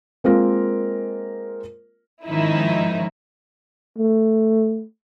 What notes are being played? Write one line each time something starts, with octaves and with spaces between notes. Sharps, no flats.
G#3 A#3 C4 F4 A#4
G#2 D#3 F3 C#4 D#4 E4
A3